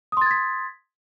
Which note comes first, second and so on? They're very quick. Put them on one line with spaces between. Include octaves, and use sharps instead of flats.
D#6 C6 A6 G#6 B6